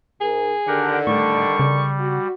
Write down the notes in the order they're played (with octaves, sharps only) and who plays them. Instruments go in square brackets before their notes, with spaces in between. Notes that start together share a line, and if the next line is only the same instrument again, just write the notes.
[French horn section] G#2 A#4 [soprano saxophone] G#4
[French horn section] D3 D#3 [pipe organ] G4 A#4 F#5
[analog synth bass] A2 [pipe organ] G3 [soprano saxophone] C#6
[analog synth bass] C#3
[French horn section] F#4